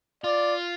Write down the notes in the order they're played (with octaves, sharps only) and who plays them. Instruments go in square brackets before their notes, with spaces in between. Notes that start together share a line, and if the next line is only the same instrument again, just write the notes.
[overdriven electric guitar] F4 [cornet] D5